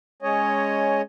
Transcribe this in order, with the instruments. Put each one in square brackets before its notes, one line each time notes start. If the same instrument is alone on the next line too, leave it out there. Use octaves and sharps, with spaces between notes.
[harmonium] G#3 C#4 C#5 D#5